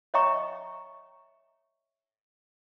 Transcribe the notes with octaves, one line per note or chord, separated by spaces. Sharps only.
C#5 D#5 E5 G5 A#5 C#6